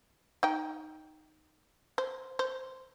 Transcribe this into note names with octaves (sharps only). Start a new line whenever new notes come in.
D#4 G5
C5
C5